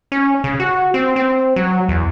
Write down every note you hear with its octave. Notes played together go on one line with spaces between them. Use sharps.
C#4
C#3
F#4
C4
C4
F#3
E2